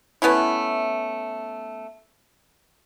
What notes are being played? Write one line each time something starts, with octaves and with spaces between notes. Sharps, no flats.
A3 B3 C#4 E4